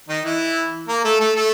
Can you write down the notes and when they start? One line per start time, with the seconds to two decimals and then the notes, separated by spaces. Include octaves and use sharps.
0.09 D#3 D#4
0.25 E3 E4
0.88 A#3 A#4
1.04 A3 A4
1.20 A3 A4
1.36 A3 A4